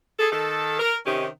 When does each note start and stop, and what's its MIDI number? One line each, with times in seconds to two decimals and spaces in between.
0.19 0.29 68
0.19 0.29 69
0.32 0.79 51
0.32 0.79 69
0.80 0.96 70
1.06 1.27 48
1.06 1.27 51
1.06 1.27 61
1.06 1.27 63
1.06 1.27 67